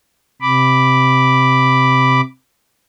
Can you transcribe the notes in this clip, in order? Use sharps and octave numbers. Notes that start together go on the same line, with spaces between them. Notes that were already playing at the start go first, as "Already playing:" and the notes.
C3 B5 D6